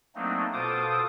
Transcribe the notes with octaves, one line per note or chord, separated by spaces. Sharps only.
F#3 A3 A#3 C4 D4 D#4
B2 F4 A4 C5 D6 D#6